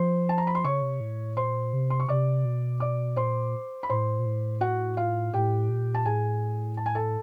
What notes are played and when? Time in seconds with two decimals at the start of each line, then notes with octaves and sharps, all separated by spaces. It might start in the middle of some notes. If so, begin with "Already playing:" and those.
Already playing: F3 C5 C6
0.29 A5
0.38 A#5
0.47 B5
0.55 C6
0.64 C#3 C#5 C#6
0.82 C3
1.00 A2
1.37 A#2 C5 C6
1.73 C3
1.90 C6
2.00 C#6
2.09 C3 D5 D6
2.45 B2
2.80 D5 D6
3.16 A#2 C5 C6
3.83 B5
3.89 A2 C5 C6
4.19 A#2
4.26 A2
4.61 F#4 F#5
4.97 F4 F5
5.33 A2 G4 G5
5.69 A#2
5.95 A5
6.06 A2 G#4 G#5
6.77 A5
6.86 G#5
6.95 A4 A5